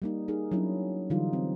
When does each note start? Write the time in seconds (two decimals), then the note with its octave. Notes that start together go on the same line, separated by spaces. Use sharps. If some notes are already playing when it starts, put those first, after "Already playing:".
0.02 G3 A#3 D#4
0.28 D#4 G#4 A#4
0.52 F#3 C#4 D4 E4
1.10 D3 E3 F#3 G3 D#4 F4
1.33 C4